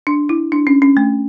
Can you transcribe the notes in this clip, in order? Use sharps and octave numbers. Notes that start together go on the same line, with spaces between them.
D4
E4
D4
C#4
C#4
A3